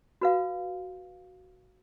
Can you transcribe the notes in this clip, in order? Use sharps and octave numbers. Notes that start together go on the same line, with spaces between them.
F#4 B4 F5